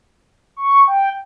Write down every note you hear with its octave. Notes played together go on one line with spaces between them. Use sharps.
C#6
G5